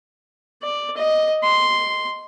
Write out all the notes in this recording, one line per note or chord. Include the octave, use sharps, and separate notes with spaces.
D5
D#5
C6